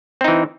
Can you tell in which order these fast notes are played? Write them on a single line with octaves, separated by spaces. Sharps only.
C4 D#4 E3